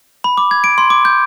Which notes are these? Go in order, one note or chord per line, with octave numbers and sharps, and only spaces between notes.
B5
D6
G#6
D7
C6
D6
G6